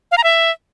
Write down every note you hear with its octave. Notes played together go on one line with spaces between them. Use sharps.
F5
A#5
E5